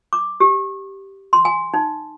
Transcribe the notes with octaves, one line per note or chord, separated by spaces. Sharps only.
D6
G4
C6
G#5
D#4